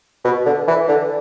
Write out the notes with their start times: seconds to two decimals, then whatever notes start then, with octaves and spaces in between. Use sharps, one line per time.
0.24 B2
0.46 D3
0.68 E3
0.88 D3